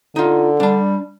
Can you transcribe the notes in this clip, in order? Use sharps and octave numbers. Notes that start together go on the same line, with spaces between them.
D3 D#4 F4
G3 D4 A5